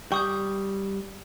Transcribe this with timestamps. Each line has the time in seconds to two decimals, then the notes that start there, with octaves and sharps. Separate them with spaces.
0.12 G3 G5 C#6 D#6 G6